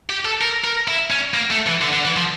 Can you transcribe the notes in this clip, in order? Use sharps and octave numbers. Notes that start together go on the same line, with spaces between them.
G4
A4
A#4
A#4
E4
C#4
A#3
A3
E3
D3
D3
E3
F3